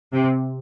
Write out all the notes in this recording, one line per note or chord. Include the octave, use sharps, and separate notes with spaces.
C3